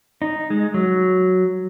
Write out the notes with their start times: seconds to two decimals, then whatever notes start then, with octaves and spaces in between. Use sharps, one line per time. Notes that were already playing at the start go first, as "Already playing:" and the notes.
0.22 D#4
0.50 G#3
0.74 F#3